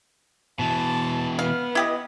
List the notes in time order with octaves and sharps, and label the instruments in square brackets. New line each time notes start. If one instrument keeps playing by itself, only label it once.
[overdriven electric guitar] B2 E3 [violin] A5
[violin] B3 [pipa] F5
[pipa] E4 G4 D#5